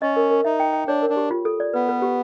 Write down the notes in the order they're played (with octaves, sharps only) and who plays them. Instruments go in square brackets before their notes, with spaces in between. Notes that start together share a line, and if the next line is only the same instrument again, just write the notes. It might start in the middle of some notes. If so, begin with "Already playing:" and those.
[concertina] C#4 [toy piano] D#5
[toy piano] A#4
A#4
[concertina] D#4 [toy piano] E5
[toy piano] G5
G5
[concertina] D4 [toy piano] C#5
[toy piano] A#4
[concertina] D4
[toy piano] G4
F4
A4
D5
[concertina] B3 [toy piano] B4
[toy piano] B4
G4